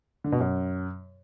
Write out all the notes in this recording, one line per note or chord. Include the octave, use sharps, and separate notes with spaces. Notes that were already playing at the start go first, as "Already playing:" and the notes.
D3
B2
F#2